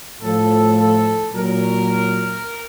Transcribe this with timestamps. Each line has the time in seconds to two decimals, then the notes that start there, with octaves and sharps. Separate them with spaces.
0.21 A2 F3 A4
0.76 A4
1.33 A#2 F#3 A#4